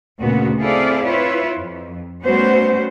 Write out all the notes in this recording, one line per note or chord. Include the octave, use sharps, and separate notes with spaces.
D2 A#2 C#3 B3 F#4
C4 E4 G#4 A4 D5 F5
E4 F4 B4 C#5 E5
F2
G3 A3 B3 C#4 F#4 C5